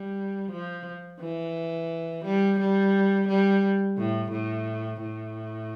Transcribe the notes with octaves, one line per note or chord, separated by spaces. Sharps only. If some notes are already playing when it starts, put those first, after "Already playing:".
Already playing: G3
F3
E3
G3
G3
G3
A2
A2
A2